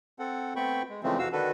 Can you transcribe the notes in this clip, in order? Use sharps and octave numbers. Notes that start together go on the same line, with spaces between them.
C4 A4 F#5
A3 B3 C4 G5 B5 C#6
G#3
C#3 E3 F3 G#3 A3 C4
F2 C3 E3 F#4 F5 E6
D3 D#3 D4 F#4 A4 B4